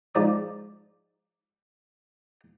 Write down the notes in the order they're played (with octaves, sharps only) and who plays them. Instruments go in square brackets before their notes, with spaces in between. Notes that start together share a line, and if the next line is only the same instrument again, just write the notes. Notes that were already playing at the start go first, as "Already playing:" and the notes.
[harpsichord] G#2 F3 D5 D#6